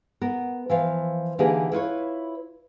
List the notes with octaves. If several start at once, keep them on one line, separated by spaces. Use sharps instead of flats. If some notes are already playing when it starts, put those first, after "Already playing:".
B3 A#4
E3 F3 F5
D3 E3 A#3 D#4 G4 G#4
E4 F4 B4 C#5